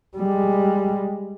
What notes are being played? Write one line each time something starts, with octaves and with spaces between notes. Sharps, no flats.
G3 G#3